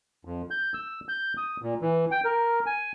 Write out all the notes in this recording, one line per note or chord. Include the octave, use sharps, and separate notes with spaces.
F2
G6
E6
G6
D#6
A#2
E3
G5
A#4
G#5